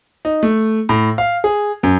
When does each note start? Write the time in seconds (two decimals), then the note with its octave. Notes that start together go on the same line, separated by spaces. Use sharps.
0.25 D#4
0.43 A3
0.89 A2
1.18 F5
1.44 G#4
1.83 F#2